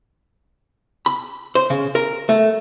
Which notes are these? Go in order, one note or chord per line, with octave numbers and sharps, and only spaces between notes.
B5
C5
C#3
A#4
A3